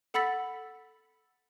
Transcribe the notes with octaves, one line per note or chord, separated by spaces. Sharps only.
A4 F#5 B5 E6 A6 B6